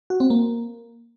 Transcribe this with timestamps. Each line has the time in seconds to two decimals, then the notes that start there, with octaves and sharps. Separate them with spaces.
0.10 F#4
0.20 C4
0.30 A#3